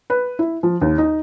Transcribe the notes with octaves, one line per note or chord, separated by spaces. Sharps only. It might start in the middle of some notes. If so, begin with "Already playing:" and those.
B4
E4
F3
D#2
D#4